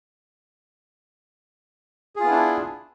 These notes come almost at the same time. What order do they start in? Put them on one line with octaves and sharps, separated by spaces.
G#4 F4 B3 E4 D4